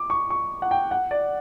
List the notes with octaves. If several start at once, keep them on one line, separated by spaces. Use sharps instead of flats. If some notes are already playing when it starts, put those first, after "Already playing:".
Already playing: D6
C#6
C#6
F#5
G5
F#5
D5